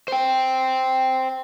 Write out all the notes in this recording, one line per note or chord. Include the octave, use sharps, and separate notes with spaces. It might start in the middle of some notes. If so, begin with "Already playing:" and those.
C5 G5